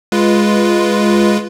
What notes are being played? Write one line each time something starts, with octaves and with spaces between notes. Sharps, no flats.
G#3 F4 B4